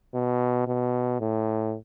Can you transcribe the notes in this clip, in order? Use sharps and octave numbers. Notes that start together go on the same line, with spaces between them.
B2
B2
A2